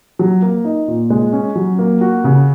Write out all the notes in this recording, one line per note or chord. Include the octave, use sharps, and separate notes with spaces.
F#3
A#3
D#4
A#2
G#3
C#4
F#3
A#3
F#4
C#3